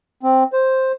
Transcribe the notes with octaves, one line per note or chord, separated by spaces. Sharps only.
C4
C5